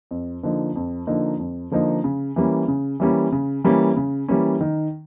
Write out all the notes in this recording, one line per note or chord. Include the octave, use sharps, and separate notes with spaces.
F2
D3 F3 A#3 D#4
F2
D3 F3 A#3 D#4
F2
D3 F3 A#3 D#4
C#3
E3 G3 A#3 C#4
C#3
E3 G3 A#3 C#4
C#3
E3 G3 A#3 C#4
C#3
E3 G3 A#3 C#4
D#3